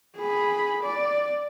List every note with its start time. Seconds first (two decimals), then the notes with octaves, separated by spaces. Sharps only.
0.17 G#4 B5
0.83 D5